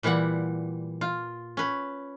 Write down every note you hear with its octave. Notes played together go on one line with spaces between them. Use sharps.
A#2 E3 G3 E4 F#5
F4
C#4 B4